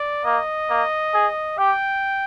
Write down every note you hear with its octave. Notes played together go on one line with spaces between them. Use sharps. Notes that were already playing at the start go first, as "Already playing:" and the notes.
Already playing: D5
A#3 D#5
A#3
G#4
G4 G5